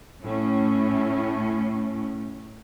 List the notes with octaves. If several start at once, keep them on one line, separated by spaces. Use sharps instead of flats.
A2 C#4